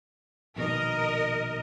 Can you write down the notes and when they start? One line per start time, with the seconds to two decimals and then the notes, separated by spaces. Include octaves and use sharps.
0.56 A#1 B2 D#3 A#4 D#5